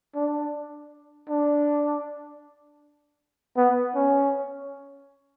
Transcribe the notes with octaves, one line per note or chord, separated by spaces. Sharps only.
D4
D4
B3
C#4